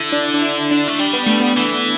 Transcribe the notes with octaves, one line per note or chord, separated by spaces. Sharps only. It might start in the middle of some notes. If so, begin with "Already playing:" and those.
Already playing: D3 E4
D4
D4
E4
D4
A3
G3 D4
B3
A3
B3
E3